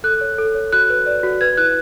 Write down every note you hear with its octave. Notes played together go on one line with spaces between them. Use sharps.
A4 F#6
C#5
A4
C#5
F#4 F#6
B4
D5
F#4
B4 G#6
E4 F#6